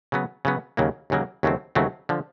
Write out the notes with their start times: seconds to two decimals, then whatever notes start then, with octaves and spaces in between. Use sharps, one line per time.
0.12 C#3 F#3 B3
0.45 C#3 F#3 B3
0.77 D#2 C#3 F#3 A#3
1.10 D#2 C#3 F#3 A#3
1.43 D#2 C#3 F#3 A3 C4
1.75 D#2 C#3 F#3 A3 C4
2.09 D3 F3